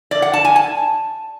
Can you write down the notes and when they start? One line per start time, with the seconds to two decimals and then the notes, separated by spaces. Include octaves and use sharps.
0.11 D5
0.22 F#5
0.33 A5
0.45 G#5
0.56 A5